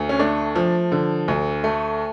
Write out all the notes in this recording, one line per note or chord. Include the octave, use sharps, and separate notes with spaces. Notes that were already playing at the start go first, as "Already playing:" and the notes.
Already playing: D2
C#4
A3 D4
F3
D3
D2
A3